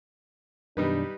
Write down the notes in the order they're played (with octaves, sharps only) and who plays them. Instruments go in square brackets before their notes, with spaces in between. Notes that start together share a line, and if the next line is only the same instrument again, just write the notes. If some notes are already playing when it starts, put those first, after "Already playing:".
[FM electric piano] F#2 B2 D#3 [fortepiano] G3 D#4 B4 [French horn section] D4